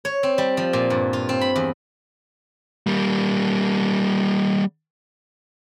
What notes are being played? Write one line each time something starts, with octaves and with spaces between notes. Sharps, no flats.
C#5
C4
G3
F3
A#2
G2
F4
C4
B5
E2
G3 A#3